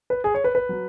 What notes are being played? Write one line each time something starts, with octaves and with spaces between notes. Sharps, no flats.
B4
G#4
C#5
B4
B4
F#3